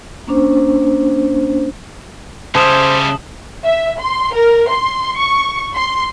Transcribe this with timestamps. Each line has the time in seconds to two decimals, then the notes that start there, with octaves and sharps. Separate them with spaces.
0.27 A#3 C#4 D4 C5
2.55 C#3 G3 C#4 C5 E5 A5 D#6 E7
3.64 E5
4.00 C6
4.35 A#4
4.70 C6
5.19 C#6
5.74 C6